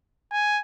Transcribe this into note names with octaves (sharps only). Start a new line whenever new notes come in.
G#5